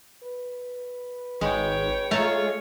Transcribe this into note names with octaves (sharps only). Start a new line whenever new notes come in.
B4
G#1 G#3 C#5 G5
G#3 A3 F4 C#5 A5 A#5